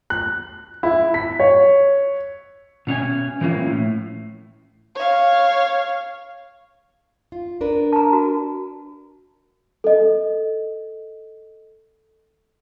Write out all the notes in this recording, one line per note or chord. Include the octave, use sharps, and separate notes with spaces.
F#6
E4
B6
C#5
B2 C#4 D4 G#5
E3 F3 A#3 C#4 E4
A2
C#5 F5
F4
D4 A#4 B4
A5 A#5
F#4
A4 D#5